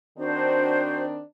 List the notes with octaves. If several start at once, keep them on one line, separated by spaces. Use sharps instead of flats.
D#3 C4 D4 F#4 C5